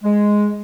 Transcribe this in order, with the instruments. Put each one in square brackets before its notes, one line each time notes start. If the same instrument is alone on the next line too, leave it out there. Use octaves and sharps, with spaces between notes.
[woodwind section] G#3